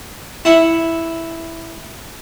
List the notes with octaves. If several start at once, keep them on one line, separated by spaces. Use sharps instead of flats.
E4 F#5